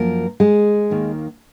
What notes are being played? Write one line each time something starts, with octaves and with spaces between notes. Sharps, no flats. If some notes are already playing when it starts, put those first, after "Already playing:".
Already playing: F#2 F3 A#3 A#4
G#3 G#4
D#2 D#3 A#3